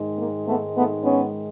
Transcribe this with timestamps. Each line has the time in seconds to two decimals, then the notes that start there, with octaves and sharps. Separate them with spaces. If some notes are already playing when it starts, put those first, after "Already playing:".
Already playing: G#2 D#3 G#3
0.19 A#3
0.47 A3 B3
0.76 A3 B3
1.04 B3 C#4